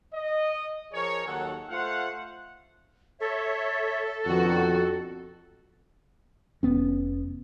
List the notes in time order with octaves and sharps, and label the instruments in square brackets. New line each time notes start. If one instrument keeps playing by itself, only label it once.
[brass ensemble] D#5
F3 G#4 A#4 C#5
D#2 D#3 F#3 A4 F#5
A3 F4 C5 F5 F#5
[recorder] A4 [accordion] C#5 E5
[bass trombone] F2 [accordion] B2 D3 D#3 [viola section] F#4
[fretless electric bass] F1 B3 C#4